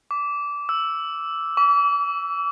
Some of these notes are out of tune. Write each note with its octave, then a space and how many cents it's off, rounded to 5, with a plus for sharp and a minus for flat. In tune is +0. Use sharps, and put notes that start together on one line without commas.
D6 -20
E6 +0
D6 -40